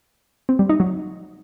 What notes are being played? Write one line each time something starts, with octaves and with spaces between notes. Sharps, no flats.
C4
G3
D#4
F#3